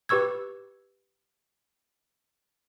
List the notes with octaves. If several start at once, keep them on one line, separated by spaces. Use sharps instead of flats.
G4 B4 C#6 E6 G#6